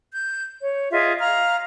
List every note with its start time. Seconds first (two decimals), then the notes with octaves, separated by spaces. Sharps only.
0.12 G6
0.61 C#5
0.92 F4 G#4 D#5 E5
1.19 F5 A#5 F6